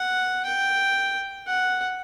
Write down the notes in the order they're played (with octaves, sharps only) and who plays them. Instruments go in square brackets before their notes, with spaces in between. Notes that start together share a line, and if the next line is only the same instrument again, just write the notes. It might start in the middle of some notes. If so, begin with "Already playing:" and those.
Already playing: [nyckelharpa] F#5
G5
F#5